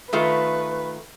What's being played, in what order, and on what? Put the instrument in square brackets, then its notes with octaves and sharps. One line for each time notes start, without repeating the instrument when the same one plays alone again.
[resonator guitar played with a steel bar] D#3 A3 F4 [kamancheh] B4